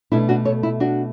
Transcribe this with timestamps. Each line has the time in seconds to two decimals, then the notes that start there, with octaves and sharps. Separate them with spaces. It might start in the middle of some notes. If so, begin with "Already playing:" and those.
0.12 B2 A3 D4 E4
0.29 D4 F#4
0.45 A4 C#5
0.63 E4
0.80 D4 F#4